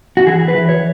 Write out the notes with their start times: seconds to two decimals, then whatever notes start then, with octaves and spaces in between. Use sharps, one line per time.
0.17 F#4
0.27 E3 G#4
0.48 B4
0.55 E3
0.69 C#5